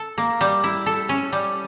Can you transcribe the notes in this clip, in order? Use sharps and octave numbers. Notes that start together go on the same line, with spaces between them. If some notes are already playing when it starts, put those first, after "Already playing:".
Already playing: A4
A#3
G3
E4
A4
C#4
G3